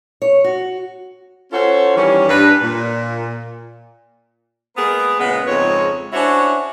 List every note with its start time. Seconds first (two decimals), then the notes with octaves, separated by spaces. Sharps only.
0.22 C#5
0.44 F#4
1.52 C#4 F4 F#4 A4 C5 C#5
1.96 D#3 E3 G3 C#4
2.28 G2 B4
2.63 A#2
4.76 G#3 A#3 B3 G#4 A#4 B4
5.20 A#2 C#3 G#3 B3
5.48 F2 G#2 C#3 G#3 C#5
6.13 C#4 D4 E4 F#4 C5 C#5